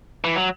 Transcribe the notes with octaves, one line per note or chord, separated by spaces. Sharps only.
E3
F#3